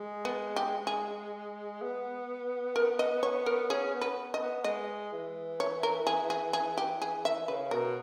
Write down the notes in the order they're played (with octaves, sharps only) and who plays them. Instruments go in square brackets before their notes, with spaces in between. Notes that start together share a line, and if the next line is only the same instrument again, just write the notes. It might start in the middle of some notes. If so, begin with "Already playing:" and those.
Already playing: [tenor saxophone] G#3
[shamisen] B3
G4
G#4
[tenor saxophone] B3
[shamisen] A#4
D#5
C#5
A#4
[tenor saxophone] C#4 [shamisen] G#4
[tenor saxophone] B3
[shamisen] B4
D#5
[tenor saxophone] B3
[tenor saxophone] G#3 [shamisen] D#5
[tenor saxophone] E3
[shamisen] C#5
A#4
G#4
G#4
G#4
G4
G#4
E5
[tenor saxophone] C#3 [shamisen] B4
[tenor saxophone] B2 [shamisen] A#4